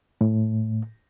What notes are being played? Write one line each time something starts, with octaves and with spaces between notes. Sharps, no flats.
A2